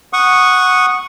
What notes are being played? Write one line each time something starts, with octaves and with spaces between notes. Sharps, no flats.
F#5 C#6 D#6